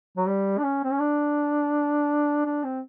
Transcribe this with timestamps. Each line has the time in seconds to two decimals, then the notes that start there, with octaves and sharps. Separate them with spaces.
0.17 F#3
0.27 G3
0.58 D4
0.64 C#4
0.84 C4
0.92 C#4
1.00 D4
2.46 D4
2.64 C4